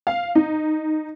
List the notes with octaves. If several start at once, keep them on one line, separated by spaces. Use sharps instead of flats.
F5
D#4